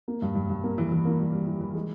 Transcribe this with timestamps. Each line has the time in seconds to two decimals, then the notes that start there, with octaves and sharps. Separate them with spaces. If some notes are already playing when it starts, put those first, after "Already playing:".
0.08 A#3
0.22 G2
0.35 G2
0.50 G2
0.64 A#3
0.78 E3
0.92 E3
1.05 A#3
1.19 G3
1.33 G3
1.46 E3
1.61 E3
1.74 G#3